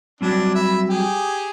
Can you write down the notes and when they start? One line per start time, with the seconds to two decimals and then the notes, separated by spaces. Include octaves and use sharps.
0.21 F#3 G3 C4 D4
0.55 E5 B5
0.90 G4 G#4